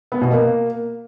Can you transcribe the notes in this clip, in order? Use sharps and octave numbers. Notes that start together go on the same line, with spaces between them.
B3
B2
A#3